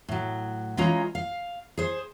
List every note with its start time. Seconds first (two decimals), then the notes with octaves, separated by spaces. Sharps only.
0.08 A2 F#3
0.77 E3 G#3 C#4 F4 A#5
1.15 F5
1.77 G#4 C5